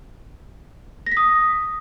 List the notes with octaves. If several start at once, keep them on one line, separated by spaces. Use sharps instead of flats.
A#6
B6
D#6